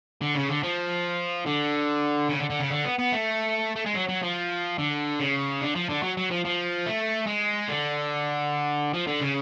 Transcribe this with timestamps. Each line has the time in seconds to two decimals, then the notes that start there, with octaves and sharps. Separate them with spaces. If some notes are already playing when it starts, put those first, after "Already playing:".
0.22 D3
0.35 C#3
0.49 D3
0.63 F3
1.46 D3
2.29 C#3
2.40 D3
2.50 D3
2.60 C#3
2.70 D3
2.85 B3
2.98 B3
3.12 A3
3.76 A3
3.86 G#3
3.95 F#3
4.09 F#3
4.23 F3
4.78 D3
5.20 C#3
5.62 D3
5.75 F3
5.89 D3
6.03 F#3
6.17 F#3
6.31 F3
6.44 F3
6.86 A3
7.27 G#3
7.69 D3
8.94 F3
9.07 D3
9.21 C#3